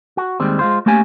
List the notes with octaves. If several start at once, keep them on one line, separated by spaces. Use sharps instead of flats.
F#4
D#2 D#3 G3 G#3 C4
G#3 F4 C5
A3 A#3 C#4 G4 G#5